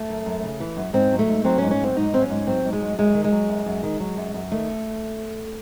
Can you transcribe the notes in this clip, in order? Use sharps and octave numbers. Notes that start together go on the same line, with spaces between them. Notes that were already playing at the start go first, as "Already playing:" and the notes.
Already playing: A3
F#2
F#2
C#3
E3
F#2
G#2 C4
F#3
A3
G#2
F#3 C4
C#4
G#2
C#4
F#3 C4
G#2 D#4
F#3 C4
C#4
G#2
F#3 C4
G#2
G#3
F#3
F#2 G#3
D#3
G#3
F#3
F#2
F#2
D#3
F#3
F#2
F#2
D#3 A3